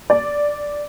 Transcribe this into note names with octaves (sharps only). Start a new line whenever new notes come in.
D5